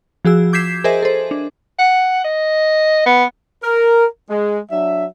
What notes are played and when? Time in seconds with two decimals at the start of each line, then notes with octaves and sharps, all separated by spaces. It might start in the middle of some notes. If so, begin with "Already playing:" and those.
0.25 F3 F#4 G#4 E6
0.53 D6 G6 G#6 B6 C7 E7
0.84 G#4 A#4 C5 D#5 E5 G#5
1.03 A4 C5
1.31 D4
1.79 F#5
2.24 D#5
3.06 B3
3.63 A#4
4.29 G#3
4.71 F#3 D4 E5